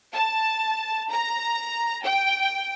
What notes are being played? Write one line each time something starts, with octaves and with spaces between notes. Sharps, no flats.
A5
A#5
G5